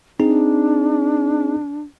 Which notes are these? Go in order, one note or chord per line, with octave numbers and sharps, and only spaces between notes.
C4 D4 D#4 G#4